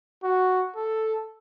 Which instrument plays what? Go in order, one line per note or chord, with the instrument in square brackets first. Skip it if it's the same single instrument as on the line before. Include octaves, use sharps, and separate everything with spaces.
[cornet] F#4
A4